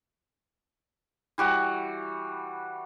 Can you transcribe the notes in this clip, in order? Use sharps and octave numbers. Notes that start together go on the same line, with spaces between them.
E3 G3 F#4